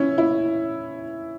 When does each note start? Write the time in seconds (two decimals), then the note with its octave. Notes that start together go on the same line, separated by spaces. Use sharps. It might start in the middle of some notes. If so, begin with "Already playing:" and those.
Already playing: C#4 E4
0.18 E4